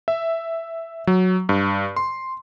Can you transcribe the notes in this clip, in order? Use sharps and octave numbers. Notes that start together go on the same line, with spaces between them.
E5
F#3
G2
C6